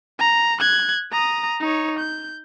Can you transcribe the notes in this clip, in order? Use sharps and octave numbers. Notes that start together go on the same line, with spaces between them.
A#5
F#6 G#6
A#5 D#6
D#4 C#5
G6